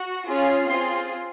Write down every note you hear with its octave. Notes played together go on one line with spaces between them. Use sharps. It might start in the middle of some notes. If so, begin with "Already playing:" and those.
Already playing: F#4
C#4 F4 G#4
C4 F4 G#4 C6